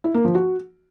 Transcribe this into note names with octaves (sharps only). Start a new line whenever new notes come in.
E4
A#3
F3
F#4